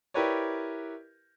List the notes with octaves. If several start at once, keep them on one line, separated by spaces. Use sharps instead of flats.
E4 G4 A#4 B4 C#5 D5